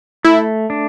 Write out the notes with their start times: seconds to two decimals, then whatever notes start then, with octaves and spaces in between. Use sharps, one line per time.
0.25 A3 E4
0.70 D4